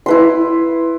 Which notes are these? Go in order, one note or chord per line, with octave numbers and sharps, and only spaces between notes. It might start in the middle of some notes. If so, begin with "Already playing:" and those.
E4 B4 C6